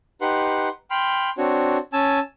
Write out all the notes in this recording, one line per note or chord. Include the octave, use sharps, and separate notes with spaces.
D#4 G4 B4 F#5 C6
G5 B5 C6 F6
C4 D4 F#4 C#5
C#4 G#5 A5 E6